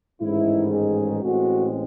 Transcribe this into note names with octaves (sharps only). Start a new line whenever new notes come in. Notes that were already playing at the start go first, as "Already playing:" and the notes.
A1 G#2 D#3 G#3 E4
G#4
A1 A2 G#3 C4 F#4